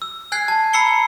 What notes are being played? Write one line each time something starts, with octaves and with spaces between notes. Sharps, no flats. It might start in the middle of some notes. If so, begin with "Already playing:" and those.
E6
G#5 F#6 G#6 C7
A5
A#5 B5 E6 C7 C#7 G7